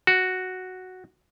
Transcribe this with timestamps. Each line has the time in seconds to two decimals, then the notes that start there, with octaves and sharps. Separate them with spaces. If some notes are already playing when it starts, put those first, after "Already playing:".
0.07 F#4